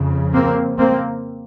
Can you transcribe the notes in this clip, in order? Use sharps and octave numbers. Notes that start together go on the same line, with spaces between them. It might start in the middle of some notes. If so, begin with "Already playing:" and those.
Already playing: F2 C#3
A#3 C4
A#3 C4